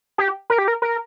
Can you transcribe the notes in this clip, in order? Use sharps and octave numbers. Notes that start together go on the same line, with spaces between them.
G4
A#4
G4
A#4
A#4